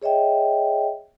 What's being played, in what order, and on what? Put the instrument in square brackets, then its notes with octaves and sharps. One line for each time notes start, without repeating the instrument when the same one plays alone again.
[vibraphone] G#4 C#5 D#5 E5 G5